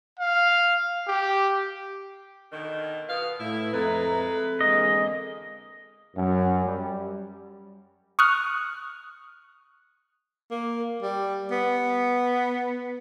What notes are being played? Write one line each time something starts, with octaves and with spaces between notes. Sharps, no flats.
F5
G4
B2 D3 D#3
B2 B4 F5 D#6
A2 E4
F2 G#3 C4 A4 B4 E5 A#5
E2 D3 G#3 A#3 D#5
F#2
G3
C#6 D#6 F6 F#6
A#3
G3
B3